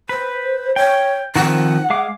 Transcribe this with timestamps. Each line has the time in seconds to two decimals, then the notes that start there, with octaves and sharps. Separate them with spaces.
0.09 B4 C5
0.76 C#5 G5
1.36 D#3 F3 C4 F#5
1.90 G#3 F5 D6